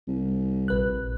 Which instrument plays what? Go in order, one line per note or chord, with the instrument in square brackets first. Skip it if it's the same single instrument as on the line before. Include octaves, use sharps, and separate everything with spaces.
[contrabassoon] C2
[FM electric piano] A#1 B4 F#6